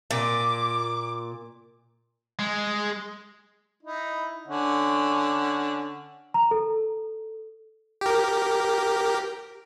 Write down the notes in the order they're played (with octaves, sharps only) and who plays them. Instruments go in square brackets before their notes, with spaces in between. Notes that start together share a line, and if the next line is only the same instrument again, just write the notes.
[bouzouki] A#2 [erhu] D6
[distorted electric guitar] G#3
[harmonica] D#4 E4
D3 C#4 F#5
[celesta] A#5
A4
[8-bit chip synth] G4 A#4